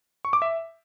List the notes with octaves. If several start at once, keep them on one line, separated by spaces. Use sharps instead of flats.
C#6
D6
E5